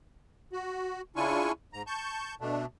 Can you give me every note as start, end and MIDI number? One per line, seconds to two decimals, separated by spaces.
0.53 1.01 66
1.16 1.52 49
1.16 1.52 62
1.16 1.52 64
1.16 1.52 65
1.16 1.52 80
1.16 1.52 85
1.73 1.82 44
1.73 1.82 82
1.87 2.35 81
1.87 2.35 85
1.87 2.35 91
2.41 2.66 47
2.41 2.66 57
2.41 2.66 62